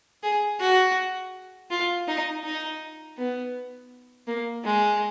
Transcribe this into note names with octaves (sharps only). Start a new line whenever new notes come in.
G#4
F#4
F4
D#4
D#4
B3
A#3
G#3